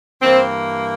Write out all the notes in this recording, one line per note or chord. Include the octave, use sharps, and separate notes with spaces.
G2 E3 A#3 C4